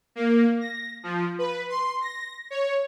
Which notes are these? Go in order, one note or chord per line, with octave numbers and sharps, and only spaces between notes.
A#3
A#6
F3
B4
C6
A#6
C#5